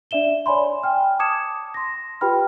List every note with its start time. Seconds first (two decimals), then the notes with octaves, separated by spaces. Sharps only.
0.11 D4 D5 E5 E7 G7
0.46 C#5 D5 G#5 B5 C6
0.83 G5 G#5 F6
1.19 A5 D6 D#6 G#6 C#7 E7
1.74 C6 A#6
2.21 F4 G4 B4 G5 B5 F6